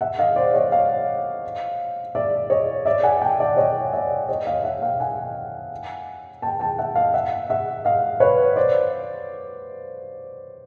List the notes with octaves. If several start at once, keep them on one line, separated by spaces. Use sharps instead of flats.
E5 F#5
D#5 F5
C5 D5
C#5 D#5
D#5 F5
D5 E5
C#5 D#5
D5 E5
F#5 G#5
G5 A5
D5 E5
C#5 D#5
D5 E5
C#5 D#5
D#5 F5
E5 F#5
F5 G5
F#5 G#5
G5 A5
G5 A5
E5 F#5
D#5 F5
E5 F#5
E5 F#5
D#5 F5
B4 C#5
C5 D5